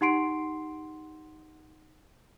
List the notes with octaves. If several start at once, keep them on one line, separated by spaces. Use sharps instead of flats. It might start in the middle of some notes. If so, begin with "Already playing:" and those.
D#4 G4 F#5 C6 C7 D7